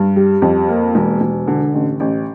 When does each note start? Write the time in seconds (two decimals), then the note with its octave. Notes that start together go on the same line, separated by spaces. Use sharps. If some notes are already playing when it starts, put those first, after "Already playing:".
Already playing: G2
0.16 G3
0.42 F2
0.69 A#3
0.95 E1
1.21 E1
1.47 D3
1.74 A1
2.00 A1